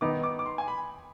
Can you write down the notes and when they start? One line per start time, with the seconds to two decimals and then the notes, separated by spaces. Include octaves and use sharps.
0.01 D#3 B3 D#4 D6
0.23 D6
0.39 D6
0.46 C6
0.58 G#5
0.68 B5